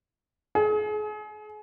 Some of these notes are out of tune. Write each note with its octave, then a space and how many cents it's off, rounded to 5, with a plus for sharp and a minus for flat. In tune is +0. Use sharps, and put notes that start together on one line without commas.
G#4 +35